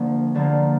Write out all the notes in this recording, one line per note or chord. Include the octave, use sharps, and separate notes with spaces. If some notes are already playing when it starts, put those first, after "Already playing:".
Already playing: D2 D3 F3 A#3
D2 D3 F3 A#3